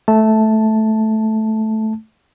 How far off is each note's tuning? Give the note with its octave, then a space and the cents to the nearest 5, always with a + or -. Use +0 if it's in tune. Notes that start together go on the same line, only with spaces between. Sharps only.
A3 -10 A5 +0